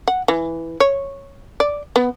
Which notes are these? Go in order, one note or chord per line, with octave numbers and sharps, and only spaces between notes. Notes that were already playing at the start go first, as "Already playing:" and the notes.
F#5
E3
C#5
D5
B3